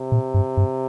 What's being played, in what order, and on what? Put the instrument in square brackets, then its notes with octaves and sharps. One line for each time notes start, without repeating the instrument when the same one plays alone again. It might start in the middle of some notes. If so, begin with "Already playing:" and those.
Already playing: [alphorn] C3
[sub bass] A#2
G2
G2